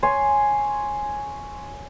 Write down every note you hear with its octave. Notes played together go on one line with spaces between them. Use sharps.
C#5 G#5 C6